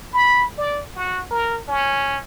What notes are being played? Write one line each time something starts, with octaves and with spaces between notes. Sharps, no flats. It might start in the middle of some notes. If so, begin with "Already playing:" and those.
B5
D5
F#4
A#4
C#4